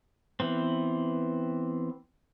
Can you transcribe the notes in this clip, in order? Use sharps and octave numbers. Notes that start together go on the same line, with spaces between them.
E3 B3 C4